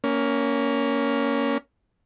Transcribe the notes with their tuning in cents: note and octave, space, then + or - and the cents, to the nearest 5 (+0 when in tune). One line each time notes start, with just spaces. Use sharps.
A#3 +0 C#4 +15